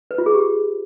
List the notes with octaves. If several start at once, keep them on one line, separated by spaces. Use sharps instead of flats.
B4
F4
G#4
G4